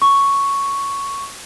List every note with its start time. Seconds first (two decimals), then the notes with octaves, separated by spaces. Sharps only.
0.02 C#6